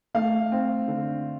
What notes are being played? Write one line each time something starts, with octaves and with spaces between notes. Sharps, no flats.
A3 F5
C4
D3